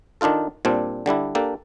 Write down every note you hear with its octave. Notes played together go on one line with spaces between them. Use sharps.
D#3 D4 D#4 F4 A4
A#2 G3 C4 D4
D3 G3 D4 E4
A#3 D4 G4 A4